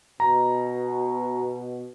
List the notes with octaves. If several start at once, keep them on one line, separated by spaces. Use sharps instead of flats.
B2 A#5